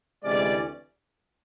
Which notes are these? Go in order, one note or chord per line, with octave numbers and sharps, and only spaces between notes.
D2 C3 E3 G#3 C#4 D5